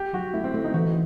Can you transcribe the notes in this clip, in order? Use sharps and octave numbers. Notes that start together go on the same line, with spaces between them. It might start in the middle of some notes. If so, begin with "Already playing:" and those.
Already playing: G4
F#3 F#4
A3 E4
C4
A3
D#4
E3 F#4